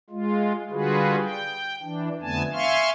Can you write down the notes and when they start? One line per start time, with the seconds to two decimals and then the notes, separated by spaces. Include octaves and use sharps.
0.10 G#3 F4
0.71 D3 G3 F4 F#4 G#4 B4
1.22 G5
1.82 E3 D4
2.22 F2 D3 A3 B3 G#5 A5
2.53 E5 F5 G#5 C6 C#6 F6